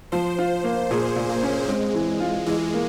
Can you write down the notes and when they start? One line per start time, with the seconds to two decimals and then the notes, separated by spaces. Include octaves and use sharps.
0.12 F3 C5
0.39 F4
0.64 A#3
0.91 A#2 G#4
1.16 A#2
1.29 A#3
1.43 C#4
1.69 G#3 C4
1.94 E3
2.20 F4
2.46 E3 G#3
2.73 A#3